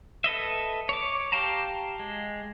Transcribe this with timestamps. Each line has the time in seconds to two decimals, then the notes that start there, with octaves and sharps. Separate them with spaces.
0.24 A4 B4 D#5 E5
0.89 C#5 D6
1.32 G4 F5 G5 A5 A#5
1.99 G#3